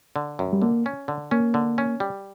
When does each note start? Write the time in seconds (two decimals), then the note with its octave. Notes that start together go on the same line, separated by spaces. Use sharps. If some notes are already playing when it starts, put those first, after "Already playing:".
0.16 D3
0.39 F#2
0.53 G3
0.62 D3 A#3
0.86 C#4
1.08 D3
1.31 A#3 C#4
1.54 D3
1.78 C#4
2.00 G3